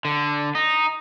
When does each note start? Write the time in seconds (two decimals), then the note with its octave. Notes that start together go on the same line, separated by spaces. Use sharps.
0.05 D3
0.55 D#4